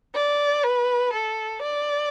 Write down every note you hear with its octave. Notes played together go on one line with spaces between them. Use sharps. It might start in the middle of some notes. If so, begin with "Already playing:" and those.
D5
B4
A4
D5